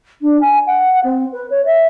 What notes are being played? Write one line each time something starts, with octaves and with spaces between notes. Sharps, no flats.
D4
G#5
F#5
C4
B4
C#5
E5